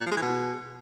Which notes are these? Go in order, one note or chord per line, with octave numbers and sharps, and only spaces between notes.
A#2
F3
G#3
E3
B2